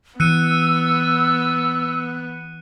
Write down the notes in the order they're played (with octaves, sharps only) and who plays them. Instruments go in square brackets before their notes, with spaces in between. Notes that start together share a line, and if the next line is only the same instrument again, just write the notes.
[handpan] E3 [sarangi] B3 [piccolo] E6 [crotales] F#6 C#7 D#7